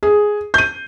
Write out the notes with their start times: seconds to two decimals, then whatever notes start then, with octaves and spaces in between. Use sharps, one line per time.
0.03 G#4
0.54 G6 D#7